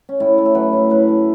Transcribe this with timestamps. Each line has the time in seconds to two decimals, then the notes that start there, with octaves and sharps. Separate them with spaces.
0.09 C#4
0.20 A2 E4
0.38 A3
0.46 A4
0.55 F#3 B4
0.73 A2
0.90 A2 B4
1.08 A3